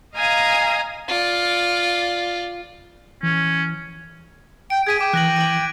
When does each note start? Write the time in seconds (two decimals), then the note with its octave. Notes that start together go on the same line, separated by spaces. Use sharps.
0.14 D#5 F5 G#5 A#5 D#6
1.08 F4 D5
3.23 E3 C#4
4.70 G5 D7
4.87 G#4 G#6 B6 D#7
5.01 G5 D6
5.13 E3 F#6 A#6 F#7
5.37 D7 F#7